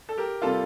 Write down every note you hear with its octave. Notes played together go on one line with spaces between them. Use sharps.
A4
G4 A#4
C3 G3 A#3 F4 A4